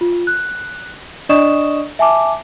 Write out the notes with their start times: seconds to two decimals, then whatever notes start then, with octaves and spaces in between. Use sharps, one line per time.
0.01 F4
0.27 F#6
1.29 D4 D5 D#5 C#6 D#6 E7
1.99 E5 G#5 A5 D6